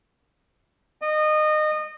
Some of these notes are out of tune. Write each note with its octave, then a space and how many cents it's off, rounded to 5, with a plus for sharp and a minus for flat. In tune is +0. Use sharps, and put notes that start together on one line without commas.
D#5 -25